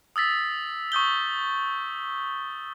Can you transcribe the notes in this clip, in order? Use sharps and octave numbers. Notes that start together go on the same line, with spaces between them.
D#6 E6 A6 B6
C#6 D#6 G6 G7